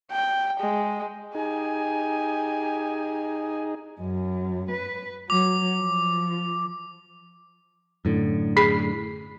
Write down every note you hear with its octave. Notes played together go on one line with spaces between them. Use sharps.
G5
G#3
D#4 G4 G#4 G#5
F#2
B4
F#3 D6
F3
F#2 A2 D3
G#4 B5 B6 C7